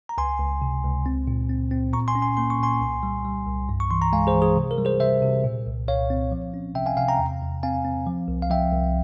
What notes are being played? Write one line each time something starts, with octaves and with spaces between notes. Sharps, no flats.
A#5
C#2 G#5 C6
C#2
C3
C#2
C4
A#2
C4
C4
A#2 A#5 C#6
G#5 C6
C#4
G#5 C6
A#3 C6
C#6
A#2 G#5 C6
C2
G3
G3
C2
G2
C#6
E3 C6
A#5
G#3 F5 G#5
G#4 C5
E3
G#4
C3
A#4
G3
G#4 C5
C3 C5 E5
C3
A#2
C2
C2 C#5 F5
C4
F3
C#4
C3 E5 G5
F5 G#5
C3 F5 G#5
G5 A#5
E2
E2
C4 F5 G#5
C4
F3
C2
F5
F3 E5 G5
C2